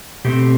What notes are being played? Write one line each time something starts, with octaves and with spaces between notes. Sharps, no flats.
B2 A3 C4 G4